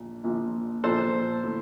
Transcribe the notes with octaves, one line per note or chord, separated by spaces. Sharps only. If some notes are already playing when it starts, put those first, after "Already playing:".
Already playing: A#1 A#2
A#1 A#2 F3
A#1 A#2 F3 A4 C5
A2 A3